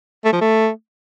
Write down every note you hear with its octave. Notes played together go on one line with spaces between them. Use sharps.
A3
F3
A3